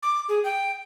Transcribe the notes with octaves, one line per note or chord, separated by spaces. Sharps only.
D6
G#4
G5